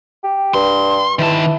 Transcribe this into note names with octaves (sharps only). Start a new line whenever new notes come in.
G4
G2 C6
D#3 E3 A5